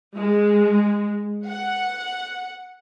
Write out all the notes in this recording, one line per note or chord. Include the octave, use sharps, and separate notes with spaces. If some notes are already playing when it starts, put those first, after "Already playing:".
G#3
F#5